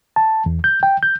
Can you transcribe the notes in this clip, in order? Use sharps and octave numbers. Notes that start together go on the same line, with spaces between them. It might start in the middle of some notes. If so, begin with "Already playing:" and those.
A5
E2
G6
G5
G6